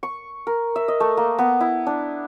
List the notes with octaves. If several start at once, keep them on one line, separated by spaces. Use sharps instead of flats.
C#6
A#4
E5
D#5
A3
A#3
B3
E4
D4